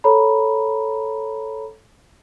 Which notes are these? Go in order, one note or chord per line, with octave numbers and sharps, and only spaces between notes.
A4 C#5 A#5 B5